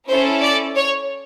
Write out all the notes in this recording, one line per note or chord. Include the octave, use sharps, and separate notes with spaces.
C#4 E4 A4 C5
D5
C#5